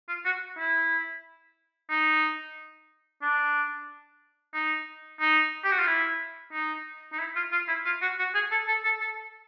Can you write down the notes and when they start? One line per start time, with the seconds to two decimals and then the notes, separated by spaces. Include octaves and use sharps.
0.09 F4
0.25 F#4
0.58 E4
1.90 D#4
3.23 D4
4.54 D#4
5.21 D#4
5.64 G4
5.72 F#4
5.79 F4
5.87 E4
6.53 D#4
7.12 D#4
7.19 E4
7.36 F4
7.52 F4
7.68 E4
7.85 F4
8.02 F#4
8.19 F#4
8.35 G#4
8.51 A4
8.68 A4
8.85 A4
9.01 A4